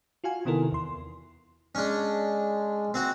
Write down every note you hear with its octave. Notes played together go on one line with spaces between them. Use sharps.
F4 F#4 F5 G#5
C3 D#3 B3 E4 A4 A#4
E2 C6
G#3 C#4 D4
C4 F#4